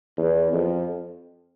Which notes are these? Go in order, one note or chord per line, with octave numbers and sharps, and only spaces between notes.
E2
F2